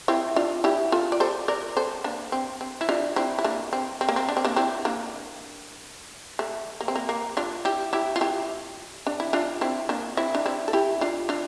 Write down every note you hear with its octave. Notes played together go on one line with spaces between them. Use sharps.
C4 E4
D4 F4
E4 G4
F4 A4
D5
A4 C5
A#4 D5
A4 C5
A#3 D4
C4
C4
E4
D4 F4
C4 E4
E4
A#3 D4
C4
C4
A#3
C4
D4
C4
A#3 D4
C4 E4
A#3 D4
A3
A#3
C4
A#3
A#3
D4 F4
E4 G4
E4 G4
F4
E4 G4
D4
E4
D4 F4
C4 E4
A#3 D4
C4 E4
D4
C4 E4
A4
E4 G4
D4 F4
D4 F4